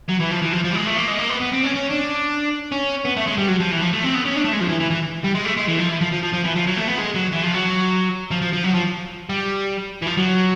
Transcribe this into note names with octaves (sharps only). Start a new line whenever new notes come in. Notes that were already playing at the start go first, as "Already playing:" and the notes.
F#3
E3
F3
E3
F3
F3
G3
G#3
A3
A#3
G#3
A#3
B3
B3
C4
C#4
C#4
D4
C#4
B3
A3
G#3
G3
F#3
F3
E3
F3
A3
C4
B3
C#4
D4
A3
G#3
F3
E3
E3
E3
G3
G#3
A3
G#3
E3
F3
E3
F3
F3
F3
F3
E3
F3
F#3
A3
B3
G#3
F#3
E3
F3
F#3
F3
F3
F3
F#3
F3
G3
E3
F3
F#3